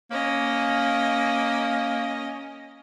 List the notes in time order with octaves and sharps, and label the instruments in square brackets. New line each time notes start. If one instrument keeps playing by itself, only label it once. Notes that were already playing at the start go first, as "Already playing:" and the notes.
[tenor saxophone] A#3 [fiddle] C#4 D#5